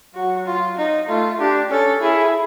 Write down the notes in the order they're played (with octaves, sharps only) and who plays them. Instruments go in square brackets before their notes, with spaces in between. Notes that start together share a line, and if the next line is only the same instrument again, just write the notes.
[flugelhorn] F#3 [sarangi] F#4
[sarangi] F4
D#4
[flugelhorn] A3 [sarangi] F4
[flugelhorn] D4 [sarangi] G4
[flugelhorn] C#4 [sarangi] A4
[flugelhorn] E4 [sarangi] G#4